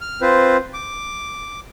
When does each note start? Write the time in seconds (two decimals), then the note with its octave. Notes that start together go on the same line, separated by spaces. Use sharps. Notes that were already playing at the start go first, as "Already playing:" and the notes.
0.01 F6
0.21 C4 F4 B4 C5
0.74 D6